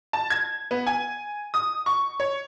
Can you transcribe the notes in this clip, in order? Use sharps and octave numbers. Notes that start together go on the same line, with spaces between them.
A5
G#6
B3
G#5
D#6
C#6
C#5